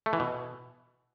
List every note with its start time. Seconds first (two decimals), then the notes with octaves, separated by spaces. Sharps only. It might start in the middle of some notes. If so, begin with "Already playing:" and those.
0.06 A3
0.13 E3
0.20 B2